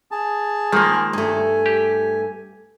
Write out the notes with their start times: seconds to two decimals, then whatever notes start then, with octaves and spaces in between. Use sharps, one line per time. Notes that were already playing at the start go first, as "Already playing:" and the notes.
0.11 G#4 A5
0.72 D#3 F3 G#3 A#3 A#4
1.13 G2 A3 G#5
1.66 G4